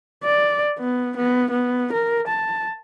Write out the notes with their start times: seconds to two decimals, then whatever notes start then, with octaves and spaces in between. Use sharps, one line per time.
0.24 D5
0.78 B3
1.16 B3
1.51 B3
1.93 A#4
2.28 A5